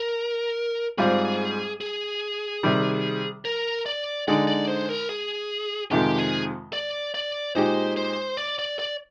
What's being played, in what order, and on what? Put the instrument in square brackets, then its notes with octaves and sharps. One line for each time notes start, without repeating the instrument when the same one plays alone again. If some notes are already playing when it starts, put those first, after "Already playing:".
Already playing: [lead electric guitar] A#4
[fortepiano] G#2 G3 C4 F4 [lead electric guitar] G#4
[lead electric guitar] G#4
[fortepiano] C3 D#3 G3
[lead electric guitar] A#4
D5
[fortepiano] D3 G#3 D#4 [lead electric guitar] D5
[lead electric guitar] D5
C5
A#4
G#4
[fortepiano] F2 C3 D#3 G#3 [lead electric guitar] G4
[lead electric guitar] G#4
D5
D5
[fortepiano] A#2 G#3 D#4 G4 [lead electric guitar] C5
[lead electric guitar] C5
D5
D5
D5